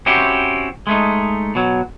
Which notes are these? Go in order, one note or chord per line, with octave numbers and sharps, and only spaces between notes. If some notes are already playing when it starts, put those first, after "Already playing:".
C4 C#4 E4 F#4 G4
G#3 A3 D#4
B2 F#3